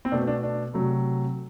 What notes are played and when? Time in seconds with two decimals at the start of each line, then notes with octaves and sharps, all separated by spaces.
0.05 C4
0.12 B2 A3 D4
0.27 D4
0.43 D4
0.74 C3 F#3 A3